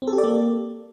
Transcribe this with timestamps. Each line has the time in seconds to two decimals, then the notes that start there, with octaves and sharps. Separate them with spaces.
0.02 C4
0.07 A4
0.13 G4
0.18 D5
0.24 A#3